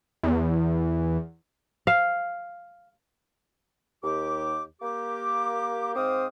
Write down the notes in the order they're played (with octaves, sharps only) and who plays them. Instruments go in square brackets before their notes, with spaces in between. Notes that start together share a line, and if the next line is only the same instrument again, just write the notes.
[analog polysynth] E2
[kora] F5
[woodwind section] D#2 G4 D6
A#3 G4 D6
G#2 C4 C5 F5 D6 D#6